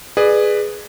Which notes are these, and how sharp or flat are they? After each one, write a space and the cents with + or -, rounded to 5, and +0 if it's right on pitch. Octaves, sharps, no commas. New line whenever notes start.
G#4 +0 B4 +0 D5 +30